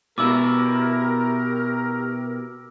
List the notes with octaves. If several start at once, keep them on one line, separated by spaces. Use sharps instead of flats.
B2 E4 G4 A#4 D6 E6